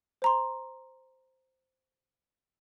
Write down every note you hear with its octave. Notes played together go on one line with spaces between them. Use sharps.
C5 A#5 C6